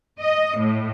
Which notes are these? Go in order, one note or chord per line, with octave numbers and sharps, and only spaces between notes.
D#5
A2